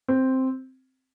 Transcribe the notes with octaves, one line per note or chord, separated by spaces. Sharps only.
C4